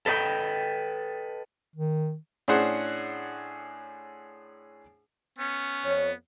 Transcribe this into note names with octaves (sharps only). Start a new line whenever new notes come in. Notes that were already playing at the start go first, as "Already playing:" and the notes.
A4 B4 D#5 G5
D#3
A2 C#4 D4 G#4 C5 F#5
B3 C#4
F2 C#5